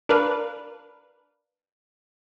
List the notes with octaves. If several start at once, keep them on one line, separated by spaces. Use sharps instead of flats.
D4 A#4 B4 F5